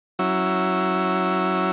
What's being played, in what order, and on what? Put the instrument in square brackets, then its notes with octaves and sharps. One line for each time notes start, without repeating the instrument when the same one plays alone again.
[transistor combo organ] F#3 C#4 E4